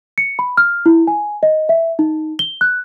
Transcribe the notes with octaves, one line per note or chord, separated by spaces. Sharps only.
C#7
B5
F6
E4
G#5
D#5
E5
D#4
G7
F#6